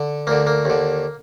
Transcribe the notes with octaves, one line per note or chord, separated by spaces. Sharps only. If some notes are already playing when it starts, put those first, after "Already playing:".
Already playing: D3
D2 D3 A#3
A#3
D#2 D3